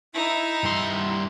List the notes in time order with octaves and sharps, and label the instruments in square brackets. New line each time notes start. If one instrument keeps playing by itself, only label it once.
[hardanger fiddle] D#4 E5 [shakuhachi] E4
[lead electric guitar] G2 C6